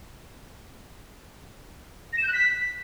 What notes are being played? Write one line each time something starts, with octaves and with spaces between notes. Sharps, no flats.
A#6
E7
G6
F#6
B6